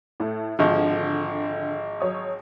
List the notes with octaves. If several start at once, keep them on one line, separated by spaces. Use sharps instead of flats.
A2 A3
G#1 D3 F3
F#3 C#5 D#6